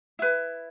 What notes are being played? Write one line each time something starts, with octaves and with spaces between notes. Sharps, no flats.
E4 B4